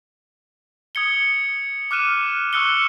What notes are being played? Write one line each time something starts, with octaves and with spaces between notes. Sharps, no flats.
D#6 G#6 C#7 G7
D6 F6 F#6 D#7 E7
C#6 D#6 E6 F#6 C#7 G7